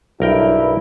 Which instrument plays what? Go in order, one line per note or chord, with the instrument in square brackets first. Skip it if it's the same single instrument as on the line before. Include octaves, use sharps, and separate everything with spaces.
[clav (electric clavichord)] B1 A#4 G5 [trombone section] G2 D4 E4